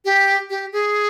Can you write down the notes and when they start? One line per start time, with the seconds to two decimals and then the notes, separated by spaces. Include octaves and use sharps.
0.05 G4
0.50 G4
0.72 G#4